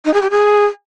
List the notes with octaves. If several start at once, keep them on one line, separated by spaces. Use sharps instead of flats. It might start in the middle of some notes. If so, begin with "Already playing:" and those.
D#4
G#4
G4
G#4